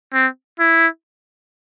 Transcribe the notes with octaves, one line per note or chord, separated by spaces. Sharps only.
C4
E4